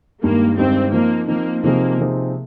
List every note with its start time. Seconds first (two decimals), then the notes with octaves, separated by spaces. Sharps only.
0.22 G2 D#3 G#3 A#3 D#4 G4
0.58 G2 D#3 G#3 C4 D#4 G4
0.93 F3 A#3 C4 D#4
1.28 F3 A#3 C4 D#4
1.62 C3 F3 A#3 C4 D#4 G#4
1.99 C3 F3 C4 D#4 G#4